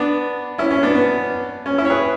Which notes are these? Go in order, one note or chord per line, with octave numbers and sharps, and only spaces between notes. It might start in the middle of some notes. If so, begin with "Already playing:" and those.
Already playing: B3 D4
C#4 E4
C#4
B3 D4
B3
C#4
C#4 E4
C#5
G#4 B4